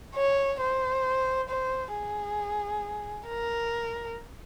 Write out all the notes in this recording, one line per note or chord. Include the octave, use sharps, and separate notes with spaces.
C#5
C5
C5
G#4
A#4